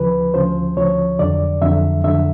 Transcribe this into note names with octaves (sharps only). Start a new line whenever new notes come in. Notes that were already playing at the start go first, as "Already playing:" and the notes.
Already playing: D2 C#3 F3 B4
D2 C#3 F3 C5
D2 C#3 F3 C#5
F2 D3 F#3 D5
F2 D3 F#3 E5
F2 D3 F#3 E5